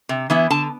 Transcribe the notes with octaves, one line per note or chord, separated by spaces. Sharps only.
C3
E3 B3 E4
D3 A5